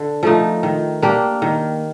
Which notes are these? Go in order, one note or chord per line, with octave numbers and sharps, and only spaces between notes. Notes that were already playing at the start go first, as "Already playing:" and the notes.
Already playing: D3
F3 A3 D#4
D#3
A#3 D4 G4
D#3